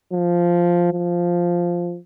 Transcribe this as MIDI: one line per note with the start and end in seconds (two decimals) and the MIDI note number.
0.12 0.89 53
0.93 1.98 53